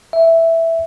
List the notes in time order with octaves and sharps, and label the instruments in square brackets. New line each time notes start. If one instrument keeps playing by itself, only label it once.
[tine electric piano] E5